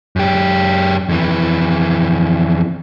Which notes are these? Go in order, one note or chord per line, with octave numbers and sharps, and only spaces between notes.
F#2 G4
F2 E3